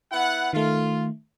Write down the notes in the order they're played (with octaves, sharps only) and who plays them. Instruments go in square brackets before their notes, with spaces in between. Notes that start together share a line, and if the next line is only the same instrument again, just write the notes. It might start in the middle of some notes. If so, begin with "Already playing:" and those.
[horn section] B3 E4 F#5
[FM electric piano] D#3 A3 [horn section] F4